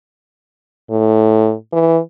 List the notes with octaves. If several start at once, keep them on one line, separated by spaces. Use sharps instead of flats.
A2
E3